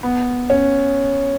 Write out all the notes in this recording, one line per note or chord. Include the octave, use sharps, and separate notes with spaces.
B3
C#4